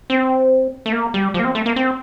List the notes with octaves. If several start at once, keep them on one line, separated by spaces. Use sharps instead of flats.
C4
A3
A#3
G3
F3
A#3
C4
A3
A#3
C4